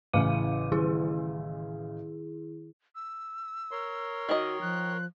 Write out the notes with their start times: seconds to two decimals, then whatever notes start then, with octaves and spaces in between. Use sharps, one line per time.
0.13 A1 C#3 E3 F5 D6 D#7
0.72 D#3 E4 G#4
2.95 E6
3.71 A#4 C#5 C6
4.29 D#3 F#4 D#5
4.62 F3 F#6